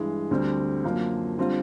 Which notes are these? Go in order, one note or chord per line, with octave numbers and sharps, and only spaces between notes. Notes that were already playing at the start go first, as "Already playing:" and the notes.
Already playing: G2 E3 G#3
D2 D3 G3 C4
F#2 D3 F3 A#3
D3 G3 C4 F4